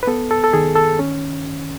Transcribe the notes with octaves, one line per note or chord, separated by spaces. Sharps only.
B4
B3 A4
A4
A4
D#3 G#4
A4
C#4